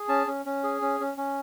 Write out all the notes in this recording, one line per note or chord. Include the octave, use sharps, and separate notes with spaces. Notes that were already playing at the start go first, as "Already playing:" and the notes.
Already playing: G#4
C#4 A5
C#4
C#4
G#4
C#4
C#4
C#4